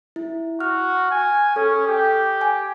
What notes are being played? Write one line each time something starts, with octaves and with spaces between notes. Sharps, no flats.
E4
F#4 F6
G#5
C#4 A4
G4
G#5